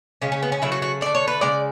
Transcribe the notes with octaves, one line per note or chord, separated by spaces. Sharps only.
C#3 G#3 C#4
C#4
B3
C#4
C#3 F#3 A3 E4
F#4
F#4
D3 A3 D5
C#5
B4
C#3 G#3 D5